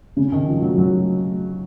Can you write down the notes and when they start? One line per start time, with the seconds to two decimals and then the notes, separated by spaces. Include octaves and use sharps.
0.17 C#3
0.32 D#3
0.47 F3
0.62 F#3
0.78 F#3